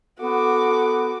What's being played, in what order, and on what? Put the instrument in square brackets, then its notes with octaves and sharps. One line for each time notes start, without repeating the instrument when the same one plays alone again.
[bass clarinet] B3 [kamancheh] F#4 D6 [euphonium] A4